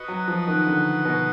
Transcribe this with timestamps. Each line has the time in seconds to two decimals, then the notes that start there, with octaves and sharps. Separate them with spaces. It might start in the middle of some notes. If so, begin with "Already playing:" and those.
Already playing: F#4 B4 D#5 F#5
0.08 F#3
0.28 F3
0.47 D#3
0.67 D3
1.05 B2